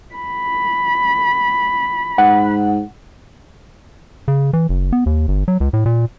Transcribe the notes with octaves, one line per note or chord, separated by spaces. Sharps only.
B5
G#2 F#5
C#3
E3
F#1
B3
D#2
G1
F#3
C#2
A2
A#2